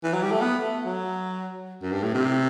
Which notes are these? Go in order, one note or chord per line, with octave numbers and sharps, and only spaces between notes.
E3
F#3
G3
A3
B3
A3
F#3
F#2
G2
A2
C3